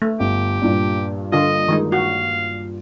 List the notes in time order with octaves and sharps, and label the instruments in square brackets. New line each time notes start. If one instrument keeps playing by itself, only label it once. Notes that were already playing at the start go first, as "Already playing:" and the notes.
[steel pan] A3
[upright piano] G1 [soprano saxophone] G4
[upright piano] G2 A#2 D4
[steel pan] D3 F4 [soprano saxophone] D#5
[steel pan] D#3 G#3 D#4
[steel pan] F#4 [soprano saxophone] F5